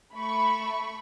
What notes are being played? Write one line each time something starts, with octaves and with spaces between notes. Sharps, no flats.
A3 B5 C#6